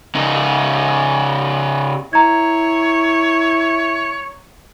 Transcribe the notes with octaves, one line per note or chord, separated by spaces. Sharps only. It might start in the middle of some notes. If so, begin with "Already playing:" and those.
C#3 D#4
E4 C#5 A#5 G#6